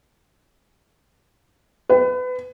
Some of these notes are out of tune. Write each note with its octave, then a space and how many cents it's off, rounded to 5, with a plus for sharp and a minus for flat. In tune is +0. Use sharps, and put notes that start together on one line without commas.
B4 +30